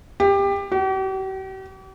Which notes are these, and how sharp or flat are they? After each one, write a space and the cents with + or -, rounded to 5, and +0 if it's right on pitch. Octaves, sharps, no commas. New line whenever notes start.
G4 +20
G4 -45